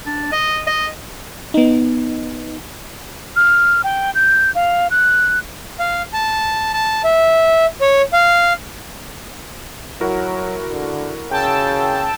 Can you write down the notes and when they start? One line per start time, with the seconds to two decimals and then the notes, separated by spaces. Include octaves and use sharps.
0.06 D4
0.32 D#5
0.67 D#5
1.54 B3 D#4
3.36 F6
3.84 G5
4.15 G6
4.55 F5
4.90 F#6
5.79 F5
6.13 A5
6.73 A5
7.04 E5
7.81 C#5
8.13 F5
10.01 F#3 E4 F#4 A#4
10.72 D3
11.31 C#3 G5 A5 E6